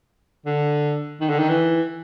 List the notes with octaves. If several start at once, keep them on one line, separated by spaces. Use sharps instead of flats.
D3
D#3
D3
D#3
E3